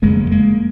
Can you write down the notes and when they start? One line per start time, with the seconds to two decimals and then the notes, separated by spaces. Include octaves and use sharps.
0.02 F#1 F2 C#3 G#3 A#3
0.31 G#3 A#3